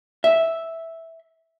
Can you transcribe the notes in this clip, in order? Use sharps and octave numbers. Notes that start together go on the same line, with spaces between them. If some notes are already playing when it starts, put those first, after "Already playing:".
E5